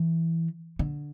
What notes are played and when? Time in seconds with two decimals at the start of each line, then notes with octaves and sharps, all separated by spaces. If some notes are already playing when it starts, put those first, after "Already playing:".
Already playing: E3
0.79 D3